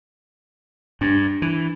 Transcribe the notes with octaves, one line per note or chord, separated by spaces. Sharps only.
G2 D4
E3